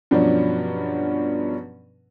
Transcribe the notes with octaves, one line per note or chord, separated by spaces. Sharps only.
G2 B2 F3 F#3 C#4 D4